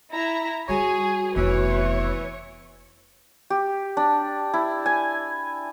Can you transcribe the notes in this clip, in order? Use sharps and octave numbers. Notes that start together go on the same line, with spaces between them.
E4 A#5
G3 F#4 G#4 C#5 G#5
F1 E3 B3 C#5
G4
D4
E4
G#5